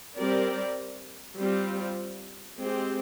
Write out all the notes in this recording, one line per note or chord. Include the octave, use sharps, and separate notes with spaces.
G3 C4 G4 A#4 D5
G3 C4 F4
G#3 C4 G4